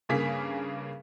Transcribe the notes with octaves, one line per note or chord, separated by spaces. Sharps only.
G2 C#3 A#3 G#4 F5 B6